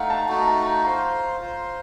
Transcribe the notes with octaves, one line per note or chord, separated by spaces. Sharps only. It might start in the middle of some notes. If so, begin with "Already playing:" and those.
Already playing: A3 D#4 F5 F#5
A5
A3 D#4 F#4
A#5
A5
A#5
F4 C5 F5 A#5
F4 C5 F5